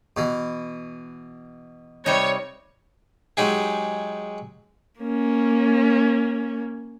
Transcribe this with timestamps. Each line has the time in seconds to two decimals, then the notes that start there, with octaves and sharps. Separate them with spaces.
0.17 B2 E3
2.06 C3 G3 D#4 C#5
3.37 F#3 G#3 D#4 G4 G#4
5.01 A#3 C#4